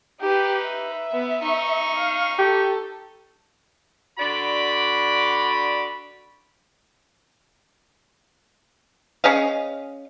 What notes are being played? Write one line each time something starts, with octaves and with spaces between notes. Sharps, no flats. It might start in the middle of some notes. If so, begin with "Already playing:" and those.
D#4 G4 B4
E5
B3
D#4 C#6
F5
G4 A4
D3 F#4 D5 B5
C#4 G#4 D#5 F5